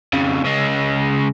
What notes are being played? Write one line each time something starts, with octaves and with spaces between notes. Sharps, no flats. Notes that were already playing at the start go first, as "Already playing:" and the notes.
F2 C#3
C#3 G#3